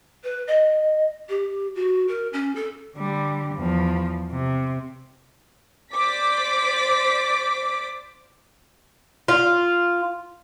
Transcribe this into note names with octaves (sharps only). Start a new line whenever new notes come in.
B4
D#5
G4
F#4
A#4
C#4
A4
D3 G3
E2 F3
C3
C5 D5 D6 B6
F4